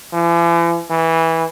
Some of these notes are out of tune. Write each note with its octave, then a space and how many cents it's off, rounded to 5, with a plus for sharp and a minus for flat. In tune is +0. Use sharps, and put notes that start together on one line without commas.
E3 +45
E3 -15